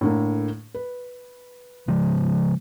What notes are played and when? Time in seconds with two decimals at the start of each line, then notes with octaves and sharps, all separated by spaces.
0.01 A2 D3 A#3
0.74 B4
1.88 C#3 F3 G#3